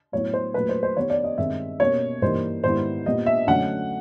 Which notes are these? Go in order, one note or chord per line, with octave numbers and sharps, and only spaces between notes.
A2 F#3 B3 E4 C#5
C5
A#2 F#3 A3 B4
C5
C5
D#3 G3 B3 D#4 C#5
D5
D#5
G2 D#3 G#3 C4 E5
B2 G3 A#3 C#4 C#5
G2 E3 G3 A#3 D#4 C5
G#2 D#3 G3 B3 E4 C5
A#2 G3 B3 D#5
E5
D3 F#3 A3 C#4 F#5